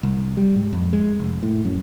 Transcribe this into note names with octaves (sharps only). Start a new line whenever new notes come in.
C2
G3
G#2
F2
G#3
F1
A2
F#2